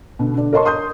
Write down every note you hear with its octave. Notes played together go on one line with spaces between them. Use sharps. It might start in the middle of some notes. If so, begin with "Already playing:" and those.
B2 D3
D3 D5
A#4 C#5 D#5 A5 C6 C#6
C6 D#6 G6